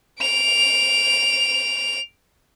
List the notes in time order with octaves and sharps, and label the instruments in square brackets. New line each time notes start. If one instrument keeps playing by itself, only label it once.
[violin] D7 F7